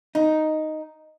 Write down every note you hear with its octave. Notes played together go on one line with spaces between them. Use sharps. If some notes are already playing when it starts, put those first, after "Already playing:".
D#4